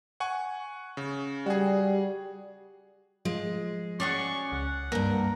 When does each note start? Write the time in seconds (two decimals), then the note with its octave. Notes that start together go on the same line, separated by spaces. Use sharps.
0.20 F#5 G#5 C#6
0.97 C#3
1.46 G3 F#4 G#4
3.25 F3 G#3
4.00 C#4 F#4 G#4 D5 C#6
4.52 C#2 F#5
4.92 E2 G2 A#3 A#4